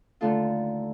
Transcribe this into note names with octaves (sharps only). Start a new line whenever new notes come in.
D#2 D3 A3 F4 A4